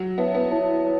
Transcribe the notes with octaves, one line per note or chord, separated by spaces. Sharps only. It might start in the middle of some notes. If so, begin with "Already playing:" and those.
Already playing: F#3
B3 E4 C#5 E5 A5
B3
E4 C#5 E5 A5
C#5 A5